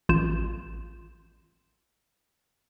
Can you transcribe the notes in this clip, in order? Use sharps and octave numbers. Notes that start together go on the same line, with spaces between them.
A1 F4 G6 E7